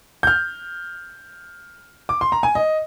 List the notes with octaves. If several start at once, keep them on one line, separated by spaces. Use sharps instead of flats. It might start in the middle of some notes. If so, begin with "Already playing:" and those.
G6
F6
D6
C6
A#5
G#5
D#5